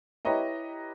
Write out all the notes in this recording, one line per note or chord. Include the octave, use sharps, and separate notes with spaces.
E4 G4 B4 C#5 D#5 A#5